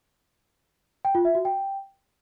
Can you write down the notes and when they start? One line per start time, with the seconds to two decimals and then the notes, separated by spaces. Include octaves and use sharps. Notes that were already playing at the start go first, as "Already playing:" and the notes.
1.05 G5
1.15 F4
1.25 E5
1.35 F#4
1.45 G5